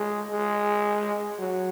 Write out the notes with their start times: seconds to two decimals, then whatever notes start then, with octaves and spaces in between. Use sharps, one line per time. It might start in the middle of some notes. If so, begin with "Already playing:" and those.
Already playing: G#3
0.31 G#3
1.39 F#3